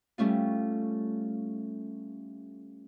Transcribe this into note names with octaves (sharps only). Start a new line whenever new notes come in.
G3 A3 C#4 F4